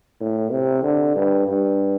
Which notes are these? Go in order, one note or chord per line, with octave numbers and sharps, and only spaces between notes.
A2
C3
D3
G2
G2